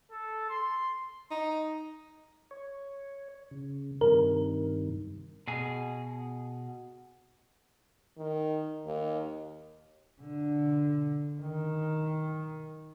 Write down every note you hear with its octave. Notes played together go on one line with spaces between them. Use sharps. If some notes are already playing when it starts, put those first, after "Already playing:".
A4
C6
D#4
C#5
C#3
G2 C3 D#3 A#4
B2 G#4
D#3
D#2
D3
D#3